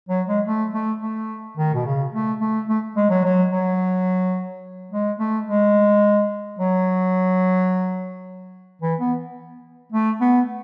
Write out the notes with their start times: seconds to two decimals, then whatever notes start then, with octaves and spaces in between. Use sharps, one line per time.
0.09 F#3
0.27 G#3
0.46 A3
0.74 A3
1.01 A3
1.57 D#3
1.74 B2
1.85 C#3
2.13 A3
2.41 A3
2.69 A3
2.97 G#3
3.10 F#3
3.24 F#3
3.52 F#3
4.92 G#3
5.19 A3
5.46 G#3
6.59 F#3
8.81 E3
9.00 B3
9.92 A3
10.21 B3